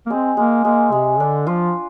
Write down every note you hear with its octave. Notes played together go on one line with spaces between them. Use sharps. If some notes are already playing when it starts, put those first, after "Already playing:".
A#3
G#3 C4
G#3 A#3
G#3 A#3
C3 G#3
D3 D4
F3 F4